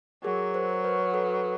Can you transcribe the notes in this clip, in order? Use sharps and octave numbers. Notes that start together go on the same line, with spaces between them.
F#3 G#4 A#4
A#4 C5
B4 C#5
A4 B4